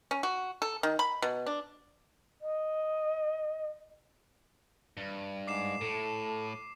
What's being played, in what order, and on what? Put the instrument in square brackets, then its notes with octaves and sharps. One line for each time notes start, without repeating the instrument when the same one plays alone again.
[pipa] C#4
F#4
A4
D#3
B5
B2
D4
[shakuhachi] D#5
[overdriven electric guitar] G2
[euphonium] G#2 [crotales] D6 C7 E7
[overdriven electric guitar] A2 [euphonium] A4 [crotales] E7